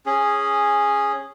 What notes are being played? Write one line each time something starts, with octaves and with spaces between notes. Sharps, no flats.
C#4 G#4